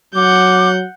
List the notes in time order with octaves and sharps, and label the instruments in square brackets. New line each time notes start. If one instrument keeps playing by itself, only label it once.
[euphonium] F#3 [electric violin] F#5 G6 [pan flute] D6